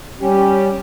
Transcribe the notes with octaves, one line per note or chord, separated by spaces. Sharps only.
G3 C#4 G4